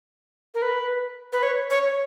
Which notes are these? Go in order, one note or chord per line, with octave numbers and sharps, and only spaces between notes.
A#4
B4
B4
C#5
C#5